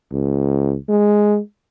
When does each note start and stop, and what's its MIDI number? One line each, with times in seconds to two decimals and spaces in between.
0.12 0.75 37
0.89 1.38 56